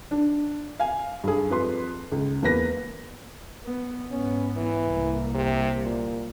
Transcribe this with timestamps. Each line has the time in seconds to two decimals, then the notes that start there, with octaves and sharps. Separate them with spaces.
0.11 D4
0.80 F5 G#5
1.24 G2 G#4
1.50 F2 B4 C6
2.12 C#2
2.42 E2 A#3 B4 A#6
3.65 B3
4.12 G#2 B3 C#4
4.57 E3
4.87 C2 A#3
5.35 C3
5.84 A#2